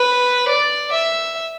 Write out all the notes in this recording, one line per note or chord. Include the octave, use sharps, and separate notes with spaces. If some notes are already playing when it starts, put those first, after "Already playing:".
Already playing: B4
D5
E5